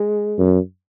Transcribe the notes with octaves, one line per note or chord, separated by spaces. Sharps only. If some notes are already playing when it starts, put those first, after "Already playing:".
Already playing: G#3
F#2